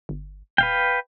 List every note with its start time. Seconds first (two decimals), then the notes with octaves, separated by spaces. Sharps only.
0.09 G1
0.58 D#1 B4 F5 G5